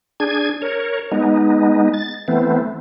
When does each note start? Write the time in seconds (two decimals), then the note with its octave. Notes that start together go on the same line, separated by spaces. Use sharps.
0.20 D4 G#4 G#6
0.62 A#4 C#5
1.12 G#3 B3 D#4
1.94 A6
2.28 E3 A3 B3 C4